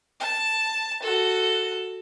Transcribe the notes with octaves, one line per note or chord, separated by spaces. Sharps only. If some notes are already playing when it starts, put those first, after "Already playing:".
A5
F#4 A4